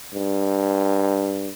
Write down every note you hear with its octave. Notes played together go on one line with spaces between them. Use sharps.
G2